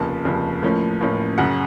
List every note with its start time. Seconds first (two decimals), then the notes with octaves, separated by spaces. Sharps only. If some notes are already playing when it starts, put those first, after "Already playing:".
Already playing: F1 D#2 C#3 F3 A5
0.24 F1 D#2 C#3 F3
0.62 A1 A2 F3 A#3 C#4
1.01 A1 A2 F3 A#3 C#4
1.38 F#2 C#3 F#3 F#5